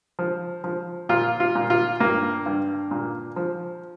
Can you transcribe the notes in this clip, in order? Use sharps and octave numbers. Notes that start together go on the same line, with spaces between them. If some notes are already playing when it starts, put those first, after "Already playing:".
F3
F3
A#2 F4
F4
A#2
F4
G2 A#3
G2
A#2
F3